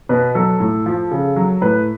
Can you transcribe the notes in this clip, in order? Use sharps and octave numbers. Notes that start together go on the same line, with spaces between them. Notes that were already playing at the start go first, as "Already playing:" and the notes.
B2 B4
F#3 A4
A2
F3
C#3
F#3
A2 B4